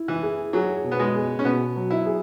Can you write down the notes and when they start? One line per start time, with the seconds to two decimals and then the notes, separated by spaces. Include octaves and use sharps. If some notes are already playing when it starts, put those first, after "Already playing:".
Already playing: E4
0.08 E3
0.22 G#4
0.53 F#3 G#4
0.84 B2
0.92 B3
0.99 G#3
1.15 G#4
1.39 C#4
1.45 B2 B3
1.76 F#3
1.91 E4
2.06 G#4